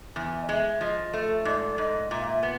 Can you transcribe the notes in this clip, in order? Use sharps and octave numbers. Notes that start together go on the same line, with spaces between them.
E2 G#5
D#5
G#3 E5
F3 D#5
A3
G#2 D5
G#2 D#5
A#2 E5
F5
E5
B3